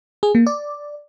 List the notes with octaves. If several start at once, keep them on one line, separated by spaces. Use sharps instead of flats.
G#4
A#3
D5